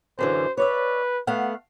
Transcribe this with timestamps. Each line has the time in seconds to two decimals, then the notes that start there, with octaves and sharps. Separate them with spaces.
0.19 F#2 D3 E3 C5
0.57 B4 C#5 D5 E5
1.27 A3 B3 F5 F#5